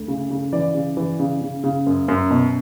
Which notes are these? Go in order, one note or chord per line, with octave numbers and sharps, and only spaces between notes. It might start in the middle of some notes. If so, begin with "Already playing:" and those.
Already playing: D2
C#3
C#3
E3 D5
C#3
E3
C#3
C#3
C#3
F#2
F#2
B2